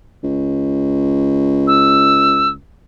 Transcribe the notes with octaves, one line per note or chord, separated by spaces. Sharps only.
C#2
E6